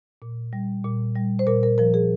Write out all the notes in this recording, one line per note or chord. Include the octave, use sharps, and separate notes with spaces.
A#2
G3
A#2
G3
C5
A#2 A#4
A#4
F3 A#4
G#4